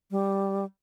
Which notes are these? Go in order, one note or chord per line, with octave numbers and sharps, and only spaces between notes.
G3